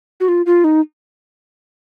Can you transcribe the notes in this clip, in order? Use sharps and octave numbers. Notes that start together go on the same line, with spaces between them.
F#4
F4
F4
D#4